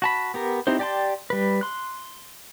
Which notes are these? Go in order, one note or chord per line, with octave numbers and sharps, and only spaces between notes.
F#4 A5 B5
B3 G4 A#4
C4 D#4 E4 G4 C5
G4 D5 G5 A5 C6
G3 B4
C6 F#6